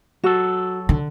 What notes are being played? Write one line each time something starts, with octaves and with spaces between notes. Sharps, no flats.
F#3 F#4 A4
D3